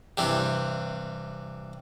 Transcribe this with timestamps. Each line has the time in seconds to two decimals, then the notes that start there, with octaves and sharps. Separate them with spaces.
0.18 G2 C3 E3